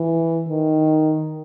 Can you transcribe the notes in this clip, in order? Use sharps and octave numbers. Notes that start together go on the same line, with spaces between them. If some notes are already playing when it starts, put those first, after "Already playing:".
Already playing: E3
D#3